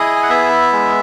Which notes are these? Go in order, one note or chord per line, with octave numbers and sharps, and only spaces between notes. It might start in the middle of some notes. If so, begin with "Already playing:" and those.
Already playing: E4 G#4 D#5
G#5
F#5
B3 E5
G#3